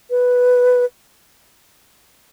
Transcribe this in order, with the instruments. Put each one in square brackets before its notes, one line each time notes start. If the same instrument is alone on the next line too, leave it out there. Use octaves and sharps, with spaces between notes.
[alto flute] B4